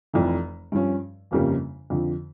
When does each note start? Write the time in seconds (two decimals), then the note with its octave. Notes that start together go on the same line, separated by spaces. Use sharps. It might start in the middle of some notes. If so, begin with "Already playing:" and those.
0.13 F1 F2 E3
0.72 G2 F3 C#4
1.31 G1 F2 C#3 G3 A#3
1.90 F2 D3 F3